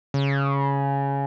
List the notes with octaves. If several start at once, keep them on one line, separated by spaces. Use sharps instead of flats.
C#3